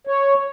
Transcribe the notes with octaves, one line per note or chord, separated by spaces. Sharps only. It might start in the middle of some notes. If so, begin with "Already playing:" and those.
C#5